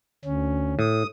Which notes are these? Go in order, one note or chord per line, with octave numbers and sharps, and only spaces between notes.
D2 C#4
A2 D#6